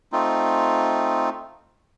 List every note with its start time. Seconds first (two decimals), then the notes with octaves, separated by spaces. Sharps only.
0.13 A3 C4 D#4 F4